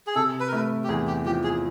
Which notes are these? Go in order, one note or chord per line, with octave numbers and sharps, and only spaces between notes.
G#4
C3 A4
B4
A#4
A3 B4
G4
E2 G#4
G4
F3 G4
G#4